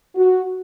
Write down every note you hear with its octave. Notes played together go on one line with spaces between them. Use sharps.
F#4